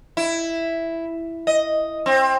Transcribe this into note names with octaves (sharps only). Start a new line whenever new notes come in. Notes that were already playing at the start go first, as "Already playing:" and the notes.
E4
D#5
C4